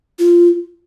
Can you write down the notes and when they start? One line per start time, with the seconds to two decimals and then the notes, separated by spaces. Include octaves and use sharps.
0.19 F4